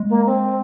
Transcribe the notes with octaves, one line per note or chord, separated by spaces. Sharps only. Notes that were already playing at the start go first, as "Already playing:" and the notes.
Already playing: G#3
A#3
C4